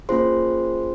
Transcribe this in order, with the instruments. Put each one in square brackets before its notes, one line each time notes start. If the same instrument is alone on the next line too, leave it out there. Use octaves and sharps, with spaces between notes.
[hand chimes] A#3 C#4 F4 G#4 C5 C6